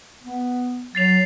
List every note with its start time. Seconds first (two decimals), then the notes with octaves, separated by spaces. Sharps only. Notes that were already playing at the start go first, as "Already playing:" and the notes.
0.23 B3
0.95 F#3 A6 C7 F7